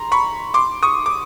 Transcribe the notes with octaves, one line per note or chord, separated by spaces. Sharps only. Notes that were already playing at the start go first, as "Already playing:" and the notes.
Already playing: A#5 C6
B5 C#6
C6 D6
C#6 D#6
D6